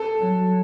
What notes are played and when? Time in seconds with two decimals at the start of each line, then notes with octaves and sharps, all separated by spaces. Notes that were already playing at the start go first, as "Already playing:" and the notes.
Already playing: A4
0.19 F#3